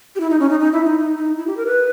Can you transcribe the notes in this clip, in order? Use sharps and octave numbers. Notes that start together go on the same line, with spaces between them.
G4
E4
D#4
C#4
D#4
D#4
E4
D#4
D#4
D#4
E4
G4
A#4
B4